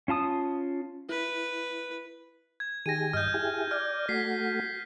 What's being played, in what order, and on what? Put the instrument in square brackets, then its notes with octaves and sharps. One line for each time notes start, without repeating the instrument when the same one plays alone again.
[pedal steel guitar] C#4 F4 A5 D#6
[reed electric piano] E4 [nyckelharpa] B4
[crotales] G#6
[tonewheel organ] D#3 G4 G#4 [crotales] A#6 D#7
[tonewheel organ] G2 D#5 [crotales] F6 G6
[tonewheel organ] E4 G4 G#4
[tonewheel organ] D5 [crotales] F6
[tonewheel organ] A3 F#4 [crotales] B6 C7